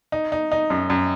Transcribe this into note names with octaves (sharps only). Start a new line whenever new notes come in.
D#4
D#4
D#4
F#2
F#2